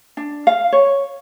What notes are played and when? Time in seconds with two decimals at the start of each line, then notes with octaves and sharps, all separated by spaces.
0.17 D4
0.47 F5
0.72 C#5